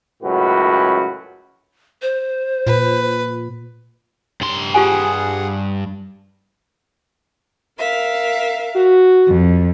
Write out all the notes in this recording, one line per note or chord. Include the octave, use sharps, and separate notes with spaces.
C#2 F#2 A2 F#4 B4
C5
A#2 B4
G2 C6
F4 G4 G#4 F#5 G#5
A#4 E5 F5
F#4
F2